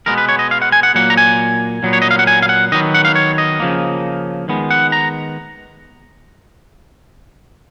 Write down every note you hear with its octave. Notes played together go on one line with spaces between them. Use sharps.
B2 G#3 B3 A#4
B4
C#5
D#5
F5
F#5
G#5
F#5
A#2 F#3 A#3 F#5
A#5
G#5
A#2 F#3 B3
C#5
D#5
F5
F#5
G#5
F5
F#5
D#3 F#3 B3 D#5
F#5
F5
C#5
D#5
C#3 F3 A#3
D#3 G#3 B3
F#5
A#5